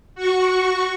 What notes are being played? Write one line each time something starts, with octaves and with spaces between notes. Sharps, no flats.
F#4 C#6